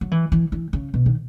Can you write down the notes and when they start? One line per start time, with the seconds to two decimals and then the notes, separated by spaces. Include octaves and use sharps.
0.01 F#3
0.11 E3
0.32 E3
0.52 E3
0.73 C#3
0.94 B2
1.06 D#3